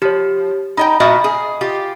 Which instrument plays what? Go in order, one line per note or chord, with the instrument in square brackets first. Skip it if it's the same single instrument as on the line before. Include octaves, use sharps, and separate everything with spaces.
[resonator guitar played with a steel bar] F3 [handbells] G4 C#5
[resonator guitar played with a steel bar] D#4 D#5 G5 [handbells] A#5 B5
[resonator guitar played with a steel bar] A#2 F#4 E5 [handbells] D#5 B5 D#6
[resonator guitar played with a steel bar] G#4
F4 G4